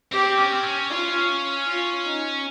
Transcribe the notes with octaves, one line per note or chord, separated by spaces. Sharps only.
C4 G4
C#4
C4
C#4
F4
F4
D#4